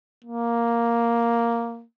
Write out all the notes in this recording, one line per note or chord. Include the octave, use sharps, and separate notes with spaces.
A#3